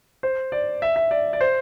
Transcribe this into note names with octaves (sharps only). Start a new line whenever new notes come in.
C5
D5
E5
E5
D5
D5
C5